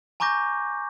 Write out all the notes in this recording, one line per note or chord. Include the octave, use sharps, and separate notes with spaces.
G#5 A#5 C#6 D6 G6 A#6